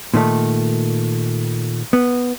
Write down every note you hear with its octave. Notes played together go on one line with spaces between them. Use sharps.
A#2 D#3 A3
B3